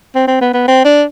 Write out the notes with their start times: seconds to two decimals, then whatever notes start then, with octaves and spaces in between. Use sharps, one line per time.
0.15 C4
0.27 C4
0.41 B3
0.54 B3
0.68 C4
0.84 D4